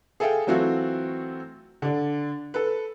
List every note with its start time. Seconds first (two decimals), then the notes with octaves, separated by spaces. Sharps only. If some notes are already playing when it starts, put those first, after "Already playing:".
0.20 G#4 A4 E5 F5 G5
0.47 E3 F#3 A3 C4 F4 F#4
1.82 D3 D4
2.54 A4 B4